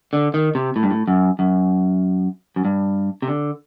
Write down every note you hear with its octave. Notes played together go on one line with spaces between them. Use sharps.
D3
D#3
C3
A2
G2
A2
F#2
F#2
F#2
G2
C3
D3